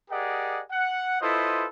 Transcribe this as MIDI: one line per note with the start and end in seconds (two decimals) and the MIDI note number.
0.10 0.62 67
0.10 0.62 68
0.10 0.62 70
0.10 0.62 74
0.10 0.62 75
0.10 0.62 78
0.71 1.19 78
1.21 1.66 64
1.21 1.66 65
1.21 1.66 69
1.21 1.66 71
1.21 1.66 72
1.21 1.66 75